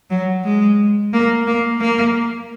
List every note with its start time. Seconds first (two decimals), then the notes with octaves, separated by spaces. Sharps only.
0.10 F#3
0.44 G#3
1.13 A#3
1.47 A#3
1.81 A#3